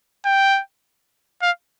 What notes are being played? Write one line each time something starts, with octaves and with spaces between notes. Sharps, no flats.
G5
F5